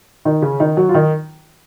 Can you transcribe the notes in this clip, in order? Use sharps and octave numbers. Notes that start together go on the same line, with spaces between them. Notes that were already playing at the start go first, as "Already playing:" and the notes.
D#3 D#4
C#3 C#4
D#3 D#4
F#3 F#4
F4
D#3 D#4